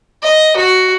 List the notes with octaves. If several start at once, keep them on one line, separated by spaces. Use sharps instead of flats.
D#5
F#4